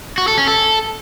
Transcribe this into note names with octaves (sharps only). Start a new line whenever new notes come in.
F#4
A4
C#4
A4